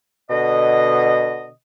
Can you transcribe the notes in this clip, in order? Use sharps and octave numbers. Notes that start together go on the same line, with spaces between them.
B2 D3 D#5